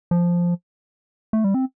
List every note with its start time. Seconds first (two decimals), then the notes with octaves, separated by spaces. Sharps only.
0.11 F3
1.33 A3
1.44 G3
1.54 C4